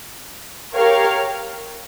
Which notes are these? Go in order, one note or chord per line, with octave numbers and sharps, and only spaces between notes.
G4 A#4 C#5 F5